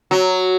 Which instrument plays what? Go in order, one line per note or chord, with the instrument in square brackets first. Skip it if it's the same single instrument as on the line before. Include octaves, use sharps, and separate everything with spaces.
[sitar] F#3